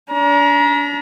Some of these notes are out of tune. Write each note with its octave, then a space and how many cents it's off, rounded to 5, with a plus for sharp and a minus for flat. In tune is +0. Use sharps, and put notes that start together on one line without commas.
D4 -35 A#5 +30